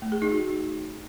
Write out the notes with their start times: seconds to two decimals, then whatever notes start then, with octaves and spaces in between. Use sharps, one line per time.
0.02 A3
0.12 G#4
0.22 D#4
0.32 F#4